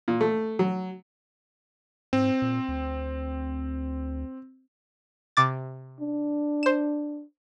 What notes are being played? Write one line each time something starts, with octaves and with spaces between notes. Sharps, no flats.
A#2
A3
F#3
G#2 C4
A#2
D2
C3 D6 A6
D4
C5 E7